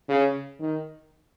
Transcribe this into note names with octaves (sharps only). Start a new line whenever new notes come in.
C#3
D#3